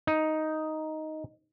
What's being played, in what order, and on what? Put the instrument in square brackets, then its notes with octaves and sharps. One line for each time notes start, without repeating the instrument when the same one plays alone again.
[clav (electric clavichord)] D#4